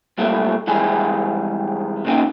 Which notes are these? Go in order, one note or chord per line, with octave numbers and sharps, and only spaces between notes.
B1 A#2 G3 A3
F2 E3 G3 G#3 G#4
A#2 C#3 A#3 C#4 D#4